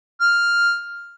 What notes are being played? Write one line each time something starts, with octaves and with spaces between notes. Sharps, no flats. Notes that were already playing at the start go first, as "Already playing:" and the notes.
F6